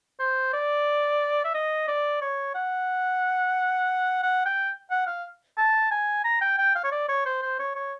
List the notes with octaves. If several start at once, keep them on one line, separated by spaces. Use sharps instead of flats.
C5
D5
E5
D#5
D5
C#5
F#5
F#5
G5
F#5
F5
A5
G#5
A#5
G5
G5
F5
C#5
D5
C#5
C5
C5
C#5
C#5